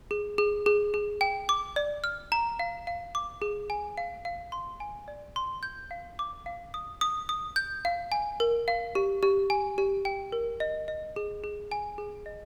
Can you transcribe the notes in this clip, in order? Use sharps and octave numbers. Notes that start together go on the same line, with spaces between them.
G#4
G#4
G#4
G#4
G5
D6
D5
F6
A#5
F5
F5
D6
G#4
G#5
F5
F5
C6
G#5
D5
C6
G6
F5
D6
F5
D#6
D#6
D#6
G6
F5
G#5
A#4
F5
G4
G4
G#5
G4
G5
A#4
D#5
D#5
G#4
G#4
G#5
G#4
D#5